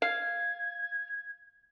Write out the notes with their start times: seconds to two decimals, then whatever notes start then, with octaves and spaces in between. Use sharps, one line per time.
0.02 F5 G#6